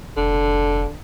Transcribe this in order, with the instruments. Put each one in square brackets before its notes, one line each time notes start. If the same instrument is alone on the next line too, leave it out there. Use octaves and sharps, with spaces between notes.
[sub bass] F1 [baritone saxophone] D3